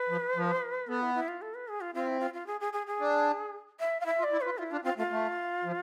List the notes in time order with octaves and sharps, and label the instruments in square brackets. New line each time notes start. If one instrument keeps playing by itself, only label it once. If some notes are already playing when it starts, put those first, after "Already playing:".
Already playing: [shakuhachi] B4
[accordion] F3
F3
[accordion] B3 [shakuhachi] A4
[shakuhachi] E4
E4
F4
A4
B4
G#4
F4
[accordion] C4 [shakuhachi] F4
[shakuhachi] E4
F4
F4
G#4
G#4
G#4
G#4
[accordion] D4
[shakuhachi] E5
F5
[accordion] E4 [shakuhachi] E5
[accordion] F4
[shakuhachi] D5
[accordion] E4
[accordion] F4 [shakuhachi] B4
[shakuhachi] E4 [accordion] F4
[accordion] D4 [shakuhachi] F4
[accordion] C4 [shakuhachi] F4
[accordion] A3 [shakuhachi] F4
[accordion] A3
F3